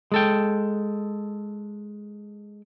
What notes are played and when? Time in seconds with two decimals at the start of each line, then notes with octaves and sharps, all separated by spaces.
0.12 G#3 A4 G5